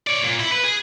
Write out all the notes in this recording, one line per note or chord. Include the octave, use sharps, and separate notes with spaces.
C#5 D5
A#2
E4
B4
G#4